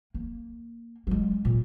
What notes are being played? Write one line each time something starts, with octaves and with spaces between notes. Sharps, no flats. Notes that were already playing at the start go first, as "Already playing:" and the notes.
A#3
F#3 G#3
A#2